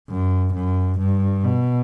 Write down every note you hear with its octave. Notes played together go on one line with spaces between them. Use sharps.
F#2
F#2
G2
B2